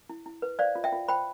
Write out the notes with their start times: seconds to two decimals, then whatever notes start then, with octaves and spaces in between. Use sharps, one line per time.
0.10 E4
0.26 E4
0.42 B4
0.59 C5 D5 F5
0.75 F4
0.84 E5 G5
0.92 F4
1.08 C5 G5 B5